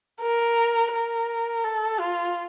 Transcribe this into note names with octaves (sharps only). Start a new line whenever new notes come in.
A#4
A#4
A4
F4